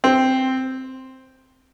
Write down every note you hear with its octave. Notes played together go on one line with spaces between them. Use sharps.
C4